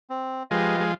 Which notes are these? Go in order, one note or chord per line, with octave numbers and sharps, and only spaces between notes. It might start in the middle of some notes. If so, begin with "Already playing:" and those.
C4
F3 G#3 G4 B4 D#5
G#3